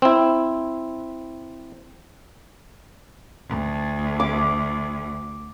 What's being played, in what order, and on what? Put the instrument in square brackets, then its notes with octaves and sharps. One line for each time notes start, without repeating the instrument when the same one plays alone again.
[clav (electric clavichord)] C4 E4
[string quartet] D2
[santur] D6